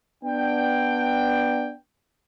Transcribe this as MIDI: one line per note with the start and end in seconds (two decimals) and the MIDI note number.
0.24 1.72 59
0.24 1.72 62
0.24 1.72 79